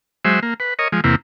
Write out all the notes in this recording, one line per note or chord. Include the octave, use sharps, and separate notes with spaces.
F#3 G#3 C5 E5
A#3
B4
A#4 C#5 D#5
F3 G#3
E2 C3 A#3 E4